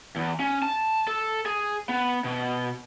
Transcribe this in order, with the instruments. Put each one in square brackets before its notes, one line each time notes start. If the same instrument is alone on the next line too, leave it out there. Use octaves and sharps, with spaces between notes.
[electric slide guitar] E2
C#4
A5
A4
G#4
B3
B2